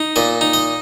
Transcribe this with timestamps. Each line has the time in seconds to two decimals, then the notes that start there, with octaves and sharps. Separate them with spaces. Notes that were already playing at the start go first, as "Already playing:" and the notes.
Already playing: D#4
0.16 A#2 D#5
0.41 D#4
0.54 D#5